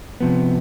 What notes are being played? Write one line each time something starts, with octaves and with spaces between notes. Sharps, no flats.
C3 F3 B3